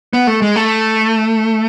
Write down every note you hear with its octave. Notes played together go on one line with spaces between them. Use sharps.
B3
A3
G#3
A3